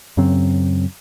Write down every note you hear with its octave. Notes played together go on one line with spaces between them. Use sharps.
F#2 C#3 F#3 C4